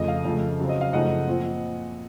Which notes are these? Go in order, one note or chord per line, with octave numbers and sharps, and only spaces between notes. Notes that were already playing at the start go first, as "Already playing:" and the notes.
Already playing: F2 C#3 A3 D#5
F5
F2 C#3 A3
C#3 F#3 C4
D#5
F5
F#2 C#3 F3 A3 D#4 D#5 F#5
A#2 F3 C4